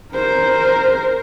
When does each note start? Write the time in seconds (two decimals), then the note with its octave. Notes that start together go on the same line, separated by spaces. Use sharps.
0.15 A#4 C5